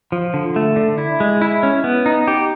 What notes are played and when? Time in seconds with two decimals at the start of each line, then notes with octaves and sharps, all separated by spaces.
0.12 F3
0.34 D3
0.56 A3
0.76 D3
0.98 E4
1.20 G#3
1.41 E4
1.63 C#4
1.84 B3
2.06 D#4
2.28 G4